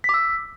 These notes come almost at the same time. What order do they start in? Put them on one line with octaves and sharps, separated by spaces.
B6 D6 E6